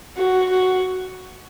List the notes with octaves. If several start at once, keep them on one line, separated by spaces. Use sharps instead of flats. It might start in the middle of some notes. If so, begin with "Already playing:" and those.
F#4
F#4